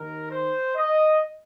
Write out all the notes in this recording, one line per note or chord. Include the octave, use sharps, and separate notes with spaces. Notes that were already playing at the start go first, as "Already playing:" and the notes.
Already playing: D#2 D#3 A#4
C5
D#5